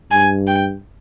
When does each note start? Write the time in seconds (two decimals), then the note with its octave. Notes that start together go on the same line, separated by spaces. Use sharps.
0.11 G2 G#5
0.47 G5